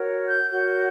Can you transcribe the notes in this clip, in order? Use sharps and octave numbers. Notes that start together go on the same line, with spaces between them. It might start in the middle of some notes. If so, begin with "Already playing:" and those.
Already playing: F#4 A#4 C#5
G6
F#4 A#4 C#5 G6